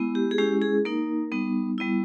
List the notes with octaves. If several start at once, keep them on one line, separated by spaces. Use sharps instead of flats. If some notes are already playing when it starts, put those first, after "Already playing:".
Already playing: G#3 B3 E4
G4
G#4
G#3 C#4 E4 G4
G#4
A#3 D#4 A#4
G3 B3 D#4
G3 B3 E4